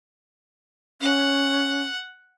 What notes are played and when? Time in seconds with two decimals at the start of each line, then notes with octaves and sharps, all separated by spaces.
1.01 C#4 F#5